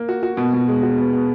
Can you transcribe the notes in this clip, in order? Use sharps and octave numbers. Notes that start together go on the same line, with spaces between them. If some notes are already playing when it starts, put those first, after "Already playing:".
Already playing: A#3
F#4
F#4
B2
B2
G#3
F#4
B3
B3